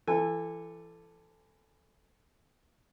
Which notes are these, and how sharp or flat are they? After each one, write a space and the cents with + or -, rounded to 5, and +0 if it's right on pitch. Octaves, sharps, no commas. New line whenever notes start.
E3 +30 A4 +0 G#5 -25